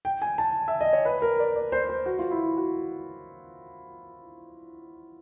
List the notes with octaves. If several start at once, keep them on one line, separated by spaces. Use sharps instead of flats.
G5
G#5
A5
E5
D#5
C#5
B4
A#4
D5
D5
C5
C5
F#4
F4
E4
F#4